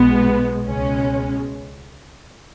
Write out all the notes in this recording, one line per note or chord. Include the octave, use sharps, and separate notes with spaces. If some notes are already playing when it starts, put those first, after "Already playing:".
Already playing: B1 B2 G#3 B3
C#2 B2 G#3 C#4